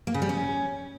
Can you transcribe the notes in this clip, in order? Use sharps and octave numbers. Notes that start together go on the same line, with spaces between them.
A#3
C#3
G3
C#4